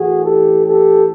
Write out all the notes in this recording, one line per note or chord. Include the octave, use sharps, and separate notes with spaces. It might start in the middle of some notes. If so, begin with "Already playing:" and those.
Already playing: A2 E3 F#4 G#4
G4 A4
G4 A4